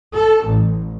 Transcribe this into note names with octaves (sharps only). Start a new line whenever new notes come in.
A4
A1